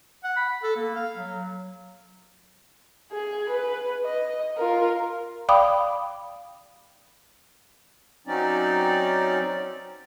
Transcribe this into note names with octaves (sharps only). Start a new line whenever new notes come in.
F#5
B5
A4
A#3
F5
F#3
G#4
B4
D#5
F4 A#4
D5 F5 G5 B5 D6 D#6
F#3 C4 C#4 D#4 D5